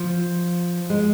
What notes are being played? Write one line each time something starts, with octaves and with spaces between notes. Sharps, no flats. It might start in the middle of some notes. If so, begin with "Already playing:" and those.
Already playing: F3
G#3